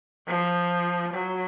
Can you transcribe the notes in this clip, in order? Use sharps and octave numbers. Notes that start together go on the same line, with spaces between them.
F3
F#3